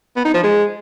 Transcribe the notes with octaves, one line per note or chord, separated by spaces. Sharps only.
B3
D#4
F3
G#3